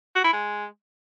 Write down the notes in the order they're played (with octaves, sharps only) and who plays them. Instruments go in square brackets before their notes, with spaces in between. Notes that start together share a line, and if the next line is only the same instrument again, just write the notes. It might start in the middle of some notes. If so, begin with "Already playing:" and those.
[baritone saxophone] F#4
E4
G#3